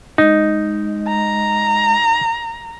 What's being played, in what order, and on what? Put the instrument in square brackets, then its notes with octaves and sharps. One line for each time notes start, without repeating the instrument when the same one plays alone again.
[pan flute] G#3 [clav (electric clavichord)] D#4
[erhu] A#5